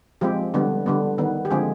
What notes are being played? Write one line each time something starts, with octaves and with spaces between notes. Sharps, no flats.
F3 G#3 C4 G4
D3 G3 B3
D3 G3 B3
D#3 B3
G4
D3 F3 G#3 C4 G#4